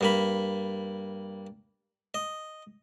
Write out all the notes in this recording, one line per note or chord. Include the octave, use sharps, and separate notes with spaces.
G2 A#3 B5
D#5